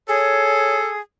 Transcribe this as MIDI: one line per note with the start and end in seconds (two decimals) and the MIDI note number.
0.08 1.00 68
0.08 0.93 69
0.08 0.77 73